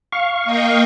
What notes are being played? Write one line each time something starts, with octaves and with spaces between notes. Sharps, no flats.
F5 C#6
A#3 D#5 G5